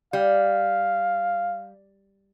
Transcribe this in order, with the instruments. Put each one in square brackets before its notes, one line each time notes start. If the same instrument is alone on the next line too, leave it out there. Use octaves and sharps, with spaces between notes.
[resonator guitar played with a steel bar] G3 [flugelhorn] F5